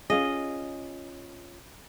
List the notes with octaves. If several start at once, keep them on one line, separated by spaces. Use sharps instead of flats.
C#4 F4 G#4 D#5